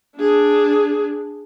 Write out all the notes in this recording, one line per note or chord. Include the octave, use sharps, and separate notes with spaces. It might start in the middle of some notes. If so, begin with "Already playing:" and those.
D4 G#4